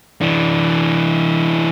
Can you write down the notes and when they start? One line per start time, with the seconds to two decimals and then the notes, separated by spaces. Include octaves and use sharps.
0.21 E3 D4